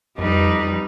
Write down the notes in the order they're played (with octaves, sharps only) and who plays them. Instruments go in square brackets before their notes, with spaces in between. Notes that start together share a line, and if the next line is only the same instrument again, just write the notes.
[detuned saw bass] F2 [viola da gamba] G3 D#4 B4